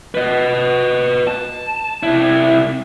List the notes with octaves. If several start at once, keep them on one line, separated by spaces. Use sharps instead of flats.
B4 D#5
A5
C3 E4